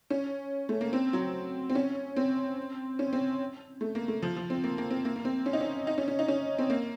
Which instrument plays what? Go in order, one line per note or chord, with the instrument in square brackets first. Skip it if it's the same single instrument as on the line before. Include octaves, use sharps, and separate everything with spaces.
[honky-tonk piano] C#4
A3
A#3
C4
F#3
C4
C#4
C4
C#4
C4
A3
A#3
A3
F3
F3
C4
A#3
A#3
C4
A#3
A#3
C4
C#4
D#4
C#4
D#4
C#4
C#4
D#4
C#4
C4
A#3